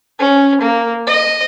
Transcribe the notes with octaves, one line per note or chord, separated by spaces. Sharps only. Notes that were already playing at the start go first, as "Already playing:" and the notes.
C#4
A#3
D#5